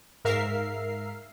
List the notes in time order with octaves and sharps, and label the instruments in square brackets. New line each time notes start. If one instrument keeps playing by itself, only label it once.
[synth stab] G#2 A#4 E5 F5 F6 C7